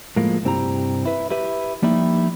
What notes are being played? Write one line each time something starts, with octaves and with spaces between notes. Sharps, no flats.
A2 F3 G#3 A#3
C2 G2 C4 E4 G4 A#5
E4 B4
E4 G4 B4 E5
F3 G3 A#3 D#4 E4